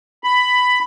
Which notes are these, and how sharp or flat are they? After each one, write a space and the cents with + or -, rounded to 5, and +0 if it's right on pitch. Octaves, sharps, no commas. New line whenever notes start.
B5 +10